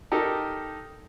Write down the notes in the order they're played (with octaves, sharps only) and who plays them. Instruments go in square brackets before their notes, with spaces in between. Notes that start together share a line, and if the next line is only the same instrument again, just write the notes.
[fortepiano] D#4 G4 A4 A#4